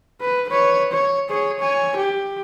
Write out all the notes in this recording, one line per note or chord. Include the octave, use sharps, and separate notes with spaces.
B4
B4 C#5
C#5
G#4 C#5
C#5 G#5
G4